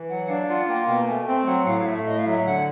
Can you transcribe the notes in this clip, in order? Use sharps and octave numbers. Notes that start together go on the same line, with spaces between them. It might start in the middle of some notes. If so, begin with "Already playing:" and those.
Already playing: E3
F#3 F#5
D4 F5
F5
F4 F#5
A#3 G5
B2 G5
A3 G#5
G#5
C4 G5
F#3 F#5
A2 F5
F5
A3 E5
A2 D#5
F5
F#3 E5
D3 F#5